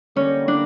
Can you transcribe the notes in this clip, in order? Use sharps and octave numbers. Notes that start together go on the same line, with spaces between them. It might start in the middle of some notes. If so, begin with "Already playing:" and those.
D3 G3 A#3 C#4
D4